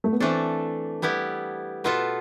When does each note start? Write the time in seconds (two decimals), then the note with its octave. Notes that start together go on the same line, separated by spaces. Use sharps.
0.04 A3
0.12 B3
0.20 E3 A3 C4 D4 A4
1.02 G3 B3 E4 G4
1.84 B2 B3 F4 A4